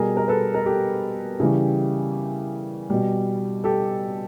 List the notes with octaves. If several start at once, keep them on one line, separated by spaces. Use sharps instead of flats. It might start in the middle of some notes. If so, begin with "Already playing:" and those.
Already playing: B2 G3 G#4 A#4
A#4
A4 B4
A#4
G4 A4
C#3 E3 G3
B2 G3
G4 A4